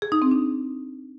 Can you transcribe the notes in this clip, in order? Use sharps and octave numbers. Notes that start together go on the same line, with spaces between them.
G#4
D#4
C4
D4